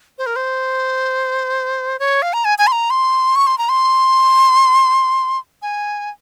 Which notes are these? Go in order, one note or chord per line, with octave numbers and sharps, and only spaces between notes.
C5
A#4
C5
C#5
F5
A#5
G#5
G#5
C6
A#5
C6
C#6
C6
A#5
C6
G#5